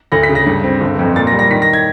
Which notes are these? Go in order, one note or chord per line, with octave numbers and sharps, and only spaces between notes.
D2 A#6
B6
C#3
A#6
G2
C4
G1
F2
A#2 A6
A#6
G3
A#6
D#3 B6
A#6
G#6